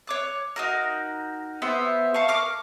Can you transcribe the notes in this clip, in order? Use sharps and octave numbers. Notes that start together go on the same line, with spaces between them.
C#5 D6 F#6
D#4 F#4 A#4
B3 G4 C5 E5
F5 A5 C#6
A#4 C#6 D6 F6